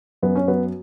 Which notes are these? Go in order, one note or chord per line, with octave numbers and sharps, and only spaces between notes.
F#2 B3
C#4
F#3 B3